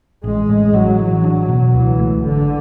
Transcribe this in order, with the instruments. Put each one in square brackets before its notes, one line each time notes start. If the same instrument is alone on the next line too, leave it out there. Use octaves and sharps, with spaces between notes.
[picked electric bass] A1 [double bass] G#3
[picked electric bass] A2
[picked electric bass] A1 [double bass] F#3
[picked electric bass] E3
D4
B2
[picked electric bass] C#2 [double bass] E3
[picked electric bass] A3
[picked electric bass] G#1 [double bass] D3